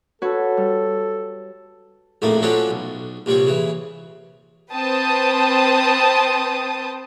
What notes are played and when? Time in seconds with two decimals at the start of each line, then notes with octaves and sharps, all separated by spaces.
0.22 F#4 A4 B4 C#5
0.57 G3
2.22 A#1 F2 A2 A3 A#3
2.42 F3 F#3 C#4 D4 A4
2.71 B1
3.26 A#1 C3 G3 C#5
3.47 C#3 E3
4.72 C4 B4 C5 G5 A5 D#6